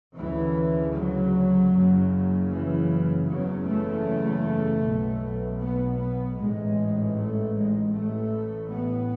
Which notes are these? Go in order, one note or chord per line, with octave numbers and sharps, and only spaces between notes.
D2 C#3 E3
F#3
F#1 F#2 C#3
E3
F#1 E2 C#3 F#3
A3
B1 B2
B3
B3
A1 G#2 G#3
A3
G#3
A1 A2 A3
B3